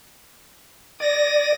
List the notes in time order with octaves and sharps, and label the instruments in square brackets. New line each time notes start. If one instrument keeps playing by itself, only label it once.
[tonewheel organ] D5 [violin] D#6 A#6